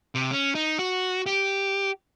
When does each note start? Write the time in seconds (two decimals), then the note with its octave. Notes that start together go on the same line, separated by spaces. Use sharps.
0.15 C3
0.31 C#4
0.55 D#4
0.79 F#4
1.26 G4